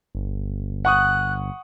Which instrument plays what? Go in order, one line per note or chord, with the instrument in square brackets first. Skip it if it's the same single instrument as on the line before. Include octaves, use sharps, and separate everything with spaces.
[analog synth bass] G1
[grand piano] F#5 C#6 D#6 [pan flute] F#6